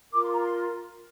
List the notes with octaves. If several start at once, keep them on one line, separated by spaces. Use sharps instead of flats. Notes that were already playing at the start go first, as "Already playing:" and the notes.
F4 A#4 D6
C6
A#5
C6